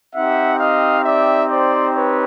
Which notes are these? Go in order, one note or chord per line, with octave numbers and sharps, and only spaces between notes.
C4 D#4 G4 E5 F#5
D#5 F5
D5 E5
C5 D5
B4 C#5